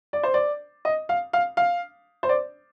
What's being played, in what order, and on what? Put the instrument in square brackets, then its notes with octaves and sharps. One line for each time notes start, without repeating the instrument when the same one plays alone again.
[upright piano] D5
C5
D5
D#5
F5
F5
F5
C5
D5